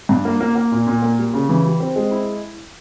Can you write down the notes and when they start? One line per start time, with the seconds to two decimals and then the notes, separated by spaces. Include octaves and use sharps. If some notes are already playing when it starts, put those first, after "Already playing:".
0.09 G2
0.25 A#3
0.40 A#3
0.55 A#3
0.72 A#2
0.87 A#2
1.02 A#3
1.19 G3
1.34 C#3
1.49 E3
1.65 G3
1.80 C4
1.96 G#3
2.11 E4